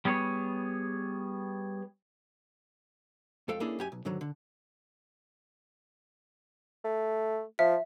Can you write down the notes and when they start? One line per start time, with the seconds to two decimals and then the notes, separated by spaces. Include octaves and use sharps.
0.05 G3 B3 G#4 C#5
3.48 F2 G#3 A4 F5 G5
3.60 A#3 C#4 D4 E4 G#4 A4
3.79 F#2 G4 G#5
3.92 B1
4.05 G#2 D3 D#3 F#3
4.21 D3
6.84 A3
7.59 F3 E5